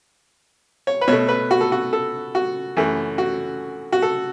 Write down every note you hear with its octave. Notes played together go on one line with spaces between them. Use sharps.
C#5
B4
B2 A3 C#5
B4
F#4
A4
F#4
A4
F#4
F#2 E3 A3
F#4
F#4
A4